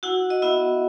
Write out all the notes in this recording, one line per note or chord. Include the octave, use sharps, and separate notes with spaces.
E4 F#4 F#5
D#5
B3 E4 E5